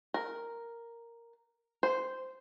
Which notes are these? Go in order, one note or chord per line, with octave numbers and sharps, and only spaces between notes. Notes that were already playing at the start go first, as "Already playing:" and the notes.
A#4
C5